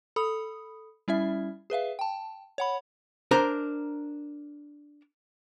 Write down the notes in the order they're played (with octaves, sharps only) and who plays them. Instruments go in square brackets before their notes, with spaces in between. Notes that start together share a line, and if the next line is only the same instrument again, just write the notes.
[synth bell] A4 B5 D#6
G3 C#4 E4 E5
G#4 B4 E5 F5
G5 A5
C#5 F#5 B5
[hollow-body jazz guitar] D4 A#4 C5 A#5